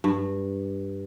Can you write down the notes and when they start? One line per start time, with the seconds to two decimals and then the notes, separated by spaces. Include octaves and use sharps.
0.04 G2